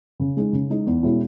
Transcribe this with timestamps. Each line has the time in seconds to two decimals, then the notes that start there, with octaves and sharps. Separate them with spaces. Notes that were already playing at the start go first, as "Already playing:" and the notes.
0.20 C#3
0.37 G#3 D#4
0.53 C#3
0.70 G#3 D#4
0.87 E2
1.03 B2 G#3 C#4 E4